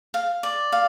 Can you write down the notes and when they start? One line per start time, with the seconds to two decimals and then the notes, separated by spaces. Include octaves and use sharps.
0.14 F5
0.43 D5
0.72 F5